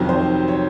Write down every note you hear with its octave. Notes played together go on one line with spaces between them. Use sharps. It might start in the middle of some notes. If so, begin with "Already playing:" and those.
Already playing: F2 C3 D#3 F#3
C5
C#5